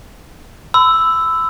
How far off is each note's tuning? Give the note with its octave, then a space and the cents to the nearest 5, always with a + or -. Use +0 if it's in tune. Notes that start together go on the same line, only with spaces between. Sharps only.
B5 +40 E6 +0